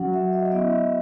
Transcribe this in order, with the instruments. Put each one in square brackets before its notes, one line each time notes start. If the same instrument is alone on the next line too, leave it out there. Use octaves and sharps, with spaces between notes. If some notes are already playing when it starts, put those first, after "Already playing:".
Already playing: [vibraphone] F#3 C#4 F#4 F#5
E5
D#5
E5
B3 E4 D#5
E5